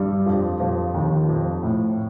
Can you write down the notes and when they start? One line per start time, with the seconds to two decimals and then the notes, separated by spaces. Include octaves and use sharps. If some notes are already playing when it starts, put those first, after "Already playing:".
Already playing: G2 G3
0.26 F2 F3
0.60 F2 F3
0.94 D#2 D#3
1.28 F2 F3
1.63 A2